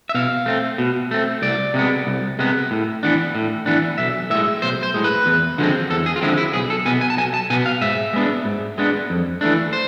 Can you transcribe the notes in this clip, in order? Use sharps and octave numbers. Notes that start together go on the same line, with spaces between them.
E5
B2 F5
A3 C4
B2
A3 C4
C2 D5
C3 G#3 B3
C2
C3 G#3 B3
A2
E3 B3 D4
A2
E3 B3 D4
B1 E5
A2 G#3 E5
B1 C5
C5
A2 G#3
B4
E2
D3 F3 G#3 C4
E2 A4
G#4
F4
D3 F3 G#3 C4 E4
E4
B1 G#4
A4
B2 B3 G#5
G#5
A5
B1 G#5
A5
B2 B3 G#5
F5
G#2 E5
G#3 B3 D4
G#2
G#3 B3 D4
F2
E3 A3 D4
C5